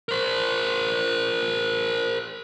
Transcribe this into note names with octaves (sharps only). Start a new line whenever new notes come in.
A#4 C5